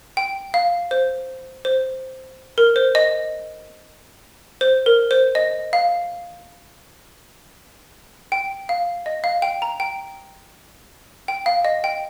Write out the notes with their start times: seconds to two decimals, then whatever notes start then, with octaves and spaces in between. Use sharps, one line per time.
0.17 G5
0.54 F5
0.91 C5
1.65 C5
2.58 A#4
2.76 C5
2.95 D#5
4.61 C5
4.86 A#4
5.11 C5
5.35 D#5
5.73 F5
8.32 G5
8.69 F5
9.06 D#5
9.24 F5
9.42 G5
9.62 A#5
9.80 G5
11.28 G5
11.46 F5
11.65 D#5
11.84 G5